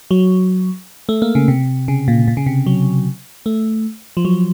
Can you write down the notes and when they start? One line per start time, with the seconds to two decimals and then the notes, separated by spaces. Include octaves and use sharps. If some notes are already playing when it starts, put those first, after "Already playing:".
0.11 F#3
1.09 A3
1.22 A#3
1.35 C#3
1.48 C3
1.88 C#3
2.08 A#2
2.28 A#2
2.37 C#3
2.46 C3
2.66 F#3
3.46 A3
4.17 F3
4.25 F#3